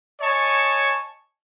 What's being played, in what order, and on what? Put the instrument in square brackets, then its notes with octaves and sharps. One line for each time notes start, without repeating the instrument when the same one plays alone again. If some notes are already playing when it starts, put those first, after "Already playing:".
[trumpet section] C#5 D#5 G#5 A5 C#6